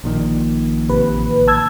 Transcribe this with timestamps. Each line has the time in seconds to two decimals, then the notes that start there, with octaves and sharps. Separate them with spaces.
0.04 A#1 A#2 D#3
0.89 A1 C3 B4
1.48 A5 E6 G#6